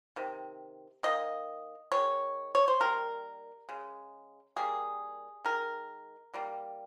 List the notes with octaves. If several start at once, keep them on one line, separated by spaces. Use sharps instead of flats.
C3 D#3
D#3 A#3 D#5
D#3 G#3 C#5
C#5
C5
D#3 G3 A#3 A#4
C#3 G#3
D#3 G3 A#3 G#4
D#3 G#3 A#4
D#3 G3 A#3